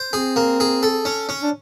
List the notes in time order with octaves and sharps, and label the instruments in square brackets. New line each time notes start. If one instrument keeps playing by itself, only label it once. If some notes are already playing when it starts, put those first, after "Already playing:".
Already playing: [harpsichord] C5
[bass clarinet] C4 [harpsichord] G#4
[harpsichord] A#3
G#4
A4
C#4
C#4
[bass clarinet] D4